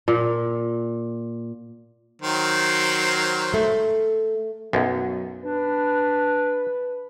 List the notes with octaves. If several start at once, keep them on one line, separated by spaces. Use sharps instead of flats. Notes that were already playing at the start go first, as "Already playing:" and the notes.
A#2
D#3 F#3 C5
A3
B1 F#2 F#3
D4 B4